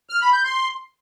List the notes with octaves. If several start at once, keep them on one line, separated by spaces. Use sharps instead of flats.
F6
B5
G6
C6